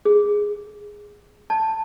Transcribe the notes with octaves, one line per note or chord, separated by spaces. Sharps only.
G#4
A5